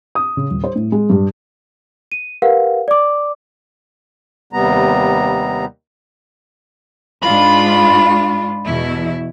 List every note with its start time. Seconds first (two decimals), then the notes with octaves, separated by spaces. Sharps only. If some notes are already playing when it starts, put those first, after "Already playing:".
0.15 D#6
0.37 C#3
0.51 D#1
0.64 C5
0.76 A2
0.92 G#3
1.10 G2
2.12 D#7
2.42 G4 A#4 B4 F5 F#5
2.88 D5 D6
4.53 D#2 C3 G3 B3 A#5
7.23 G#2 D4 F4 B5
8.66 E2 B2 E4